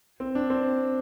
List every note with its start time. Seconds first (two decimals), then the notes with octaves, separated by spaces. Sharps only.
0.20 C4
0.35 D4
0.50 C4